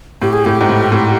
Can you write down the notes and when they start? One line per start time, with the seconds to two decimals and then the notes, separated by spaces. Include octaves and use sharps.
0.22 A2 G4
0.33 G#4
0.45 A2 G4
0.61 G#2
0.69 A2
0.92 A2